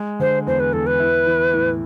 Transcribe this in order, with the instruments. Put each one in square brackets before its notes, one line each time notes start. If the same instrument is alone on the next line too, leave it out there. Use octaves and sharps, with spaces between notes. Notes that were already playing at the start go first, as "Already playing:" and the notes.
Already playing: [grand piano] G#3
[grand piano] D3 [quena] C5
[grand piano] E2 [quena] C5
[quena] B4
[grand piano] E2 [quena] A4
[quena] B4
[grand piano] E4
E3
A2